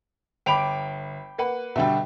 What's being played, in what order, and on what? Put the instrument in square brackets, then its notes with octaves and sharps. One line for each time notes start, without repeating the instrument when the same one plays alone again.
[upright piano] G1 D7 F7 [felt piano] G5 B5 D6
[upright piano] A#3 B4 F#5
[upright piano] B2 D3 G3 [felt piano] E5 G5